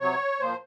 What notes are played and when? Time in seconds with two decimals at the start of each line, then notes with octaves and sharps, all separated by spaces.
0.01 C3 F#3 C#5
0.40 A#2 F3 C5